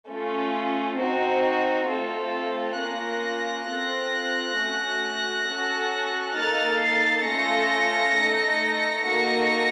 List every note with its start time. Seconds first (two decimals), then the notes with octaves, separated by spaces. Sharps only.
0.09 A3 C#4 F4
0.99 C4 D#4 F#4
1.89 A3 C4 F4 A4
2.79 A#3 C#4 F4 F#6 A#6
3.69 C4 F4 A4
4.58 A3 C#4 F#4
5.48 C#4 F#4 A4
6.37 A#3 D#4 A4 F6 A6
6.82 A6 C7
7.27 A3 C#4 F4 A4 A#6 C#7
8.16 A3 D#4 A4
9.07 A#3 D#4 F#4 A4 A#6 C#7